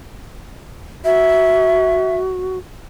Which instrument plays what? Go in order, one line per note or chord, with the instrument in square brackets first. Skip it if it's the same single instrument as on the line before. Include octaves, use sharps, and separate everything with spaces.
[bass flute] F#4 [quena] E5